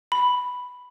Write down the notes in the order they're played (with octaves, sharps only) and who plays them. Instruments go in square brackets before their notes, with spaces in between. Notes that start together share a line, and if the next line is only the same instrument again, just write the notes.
[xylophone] B5